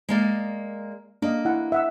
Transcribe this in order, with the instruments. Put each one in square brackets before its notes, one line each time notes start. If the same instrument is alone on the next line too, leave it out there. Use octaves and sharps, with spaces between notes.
[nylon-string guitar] G#3 A#3 D5
[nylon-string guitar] A#3 [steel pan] D4 D#5
[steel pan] E4 F#5
E5 F#5 E6